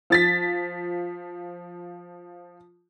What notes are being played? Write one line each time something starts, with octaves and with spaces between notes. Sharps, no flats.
F3 A6 B6